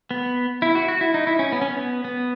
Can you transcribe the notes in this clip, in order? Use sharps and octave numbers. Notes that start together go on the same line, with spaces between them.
B3
E4
F#4
F#4
E4
D#4
E4
C#4
B3
C#4
B3
B3